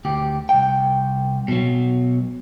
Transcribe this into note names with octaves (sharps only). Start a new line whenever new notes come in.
D2 G4
C2 G5
B2 F#3